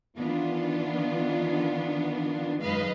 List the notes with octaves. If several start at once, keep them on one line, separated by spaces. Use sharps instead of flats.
D#3 E3 B3 D4 F4
F#2 D#3 G#3 B4 D#5 F5